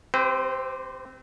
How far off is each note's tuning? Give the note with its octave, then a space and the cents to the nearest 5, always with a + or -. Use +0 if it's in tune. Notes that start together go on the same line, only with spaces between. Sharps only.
C4 +0 G4 +0 C5 -45